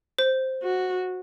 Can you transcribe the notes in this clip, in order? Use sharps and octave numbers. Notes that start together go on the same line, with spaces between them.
C5
F#4